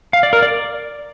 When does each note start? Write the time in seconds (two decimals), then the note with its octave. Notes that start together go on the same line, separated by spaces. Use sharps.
0.13 F5
0.23 D5
0.33 A#4
0.43 D5